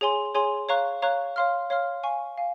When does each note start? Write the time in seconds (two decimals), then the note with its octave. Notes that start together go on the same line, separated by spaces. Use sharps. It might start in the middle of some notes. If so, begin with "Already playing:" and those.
0.01 G#4 C#5 G#5 C6
0.35 G#4 C#5 G#5 C6
0.69 C#5 F5 A#5 C#6 F#6
1.02 C#5 F5 A#5 C#6 F#6
1.36 C#5 F5 C6 F6
1.70 C#5 F5 C6 F6
2.03 F5 G#5 C#6
2.37 F5 G#5